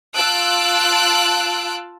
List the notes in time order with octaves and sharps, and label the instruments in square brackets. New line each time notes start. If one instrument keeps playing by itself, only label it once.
[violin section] F4 A5 E6 F#6 D7